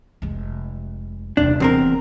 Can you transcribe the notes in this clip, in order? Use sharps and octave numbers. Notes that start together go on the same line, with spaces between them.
F1 G#3
D#1 C3 D4
E2 C4 A#4